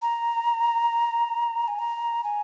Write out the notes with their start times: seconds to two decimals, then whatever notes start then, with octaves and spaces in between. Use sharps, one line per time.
0.02 A#5
1.68 G#5
1.79 A#5
2.24 G#5